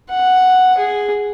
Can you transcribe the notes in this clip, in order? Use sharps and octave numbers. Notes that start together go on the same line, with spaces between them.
F#5
G#4